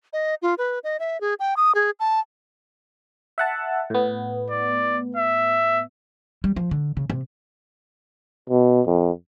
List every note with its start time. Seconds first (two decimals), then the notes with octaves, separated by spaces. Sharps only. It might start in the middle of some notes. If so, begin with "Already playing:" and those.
0.13 D#5
0.42 F4
0.58 B4
0.84 D#5
1.00 E5
1.21 G#4
1.39 G5
1.57 D#6
1.75 G#4
2.00 A5
3.38 E5 F#5 A5
3.90 A2 B3
4.50 D5
5.17 E5
6.44 G3
6.56 F3
6.71 D3
6.97 C#3
7.10 C3
8.50 B2
8.87 F2